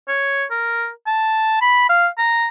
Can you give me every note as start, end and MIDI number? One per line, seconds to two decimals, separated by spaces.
0.08 0.45 73
0.51 0.89 70
1.07 1.57 81
1.62 1.88 83
1.89 2.07 77
2.18 2.48 82